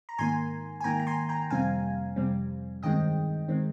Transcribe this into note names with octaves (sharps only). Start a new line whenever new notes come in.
A#5
G#2 D#3 A#3 G#5 C6
G#5
G#2 D#3 A#3 G5 A#5
A#5
G#5 C6
G5 A#5
F2 C3 G3 C4 F5 G#5
F2 C3 G3 C4
G2 D#3 G#3 C4 D#5 G5
D#3 G#3 C4